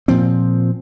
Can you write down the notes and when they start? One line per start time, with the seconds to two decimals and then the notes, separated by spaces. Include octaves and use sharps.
0.08 A#2 F3 C4